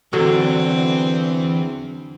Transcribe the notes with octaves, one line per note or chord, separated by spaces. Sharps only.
E2 D3 F#3 C4